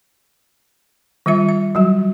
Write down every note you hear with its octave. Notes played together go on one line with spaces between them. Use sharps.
D#3 G3 F4 E5
E5
F#3 G3 F#4